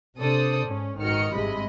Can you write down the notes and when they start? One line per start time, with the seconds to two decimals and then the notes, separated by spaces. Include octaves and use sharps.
0.19 C3 D4 A4 C5 D5 D#6
0.64 G#2 C#4
1.00 G#1 D#3 F#4 D#5 F6 C#7
1.33 G#1 G2 C3 G#3 D#5 B5